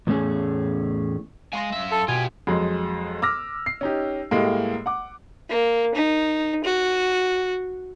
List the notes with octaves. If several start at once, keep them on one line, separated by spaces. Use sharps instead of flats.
E2 A2 A3 C#4 G#4
G#3 F5 G#5 C6 A#6
F#2 E5
A4
B2 F4 G4 G#5
F2 F#3 G#3
D6 E6 F6 A#6
C7
C#4 D#4 G4
A2 G3 G#3 A#3
F#5 D6
A#3
D#4
F#4